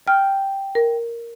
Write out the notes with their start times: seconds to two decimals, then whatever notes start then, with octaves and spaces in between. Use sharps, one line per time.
0.08 G5 F6
0.75 A#4